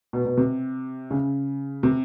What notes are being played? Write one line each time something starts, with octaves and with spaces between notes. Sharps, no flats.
B2
B2
C3
C#3
C3